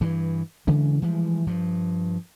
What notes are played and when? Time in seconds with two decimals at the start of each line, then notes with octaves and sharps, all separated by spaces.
0.01 G2 E3
0.67 C#3 E3 G#3 C#4
1.02 E3 F3 G3 G#3
1.47 G2 F3